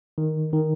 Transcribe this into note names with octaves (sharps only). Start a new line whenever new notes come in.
D#3
D#3